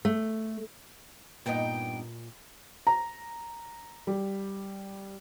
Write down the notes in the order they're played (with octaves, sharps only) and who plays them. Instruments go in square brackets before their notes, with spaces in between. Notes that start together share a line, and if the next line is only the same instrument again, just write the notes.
[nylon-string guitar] A3
[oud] G2 B3 D#4 [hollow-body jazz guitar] A#2 [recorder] G5
[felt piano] A#5
G3